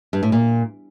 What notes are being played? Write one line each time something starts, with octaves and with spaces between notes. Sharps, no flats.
G2
A2
A#2